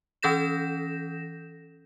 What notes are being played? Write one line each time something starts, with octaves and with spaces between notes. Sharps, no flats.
E3 C#4 A4 G6 A#6 E7